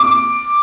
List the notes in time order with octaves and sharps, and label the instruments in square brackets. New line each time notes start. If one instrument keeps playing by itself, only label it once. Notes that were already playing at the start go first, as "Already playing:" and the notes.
Already playing: [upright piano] D6